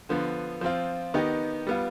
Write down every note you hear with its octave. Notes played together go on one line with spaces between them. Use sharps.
D3 F3 B3
F3 C4 F4
D#3 B3 D#4 G4
G3 B3 F4